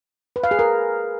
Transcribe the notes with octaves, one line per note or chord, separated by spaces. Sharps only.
B4
F5
G#4
A#4